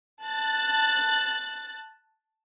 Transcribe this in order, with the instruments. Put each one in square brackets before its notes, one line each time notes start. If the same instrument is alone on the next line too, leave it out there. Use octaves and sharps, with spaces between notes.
[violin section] A5 F#6 A6